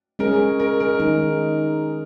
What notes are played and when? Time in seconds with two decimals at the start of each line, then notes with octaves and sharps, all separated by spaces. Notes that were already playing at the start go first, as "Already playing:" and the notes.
0.19 G#3 C#4 G#4 A#4
0.60 A#4
0.80 A#4
1.00 D#3 G#3 D#4